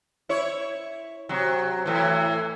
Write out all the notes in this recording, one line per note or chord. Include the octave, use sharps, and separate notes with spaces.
E4 C#5
C3 F#3
A2 E3